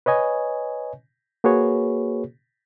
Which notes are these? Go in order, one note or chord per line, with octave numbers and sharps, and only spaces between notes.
B4 C#5 D#5 G#5
A#3 F#4 G#4 B4 C#5